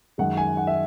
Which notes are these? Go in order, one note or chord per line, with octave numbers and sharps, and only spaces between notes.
F#2 D#3 G#3 F#5
G#5
F#5
E5